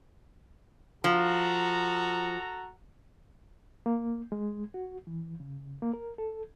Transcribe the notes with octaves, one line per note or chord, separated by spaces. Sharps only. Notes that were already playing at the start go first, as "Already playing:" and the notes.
F3 F#4 A4 A#5
A#3
G#3
F#4
E3
C#3
A#3
A#4
A4